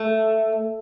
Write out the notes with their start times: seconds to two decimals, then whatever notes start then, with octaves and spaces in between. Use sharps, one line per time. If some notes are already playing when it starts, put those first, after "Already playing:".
Already playing: A3